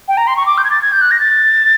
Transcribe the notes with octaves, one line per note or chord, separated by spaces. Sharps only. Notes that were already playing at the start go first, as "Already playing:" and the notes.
G5
A#5
C6
C#6
D6
G6
G#6
A6
G#6
G6
F#6
A#6
A6